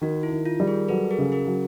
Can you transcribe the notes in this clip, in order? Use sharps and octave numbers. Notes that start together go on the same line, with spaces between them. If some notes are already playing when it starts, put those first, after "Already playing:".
D#3 F#4
E4
D#3
F4
G3
G#4 A#4
F#3 A4 B4
G#4 A#4
C#3
G#4 A#4
F#3